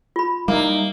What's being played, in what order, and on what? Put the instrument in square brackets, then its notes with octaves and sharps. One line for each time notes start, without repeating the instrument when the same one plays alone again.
[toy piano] F4 B5
[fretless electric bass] G3 [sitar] A#3 [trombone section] D#4 E4